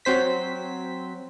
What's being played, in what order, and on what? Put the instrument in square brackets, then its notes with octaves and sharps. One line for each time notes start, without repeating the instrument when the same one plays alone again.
[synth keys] F#3 C4 C5 B6